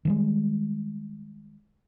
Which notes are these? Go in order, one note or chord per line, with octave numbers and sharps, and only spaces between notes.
D#3 G3 G#3